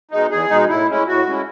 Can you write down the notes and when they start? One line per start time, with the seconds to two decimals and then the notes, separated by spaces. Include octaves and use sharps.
0.11 B2 G#3 D#4
0.30 E2 G#4
0.50 B2 G#3 D#4
0.69 A2 E4
0.88 G#3 C#4 E4
1.07 A2 F#4
1.27 G#3 C#4 E4